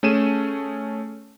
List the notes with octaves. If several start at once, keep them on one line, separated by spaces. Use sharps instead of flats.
A3 C#4 G#4 D#7 E7